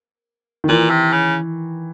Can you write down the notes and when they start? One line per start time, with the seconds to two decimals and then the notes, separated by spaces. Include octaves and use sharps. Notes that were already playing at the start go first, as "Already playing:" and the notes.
0.64 D#3
0.69 A#2 E3
0.90 C3
1.13 C#3